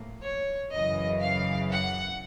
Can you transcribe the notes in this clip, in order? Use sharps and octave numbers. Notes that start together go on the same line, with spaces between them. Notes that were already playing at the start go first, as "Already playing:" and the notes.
Already playing: A2 F3 A#3
C#5
F#2 C#3 E3 D#5
F5
F#5